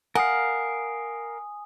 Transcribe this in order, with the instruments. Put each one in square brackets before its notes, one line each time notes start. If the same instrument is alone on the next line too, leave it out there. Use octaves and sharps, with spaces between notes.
[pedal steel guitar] A#4 F5 [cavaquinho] F#5 [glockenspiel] G#5 D#6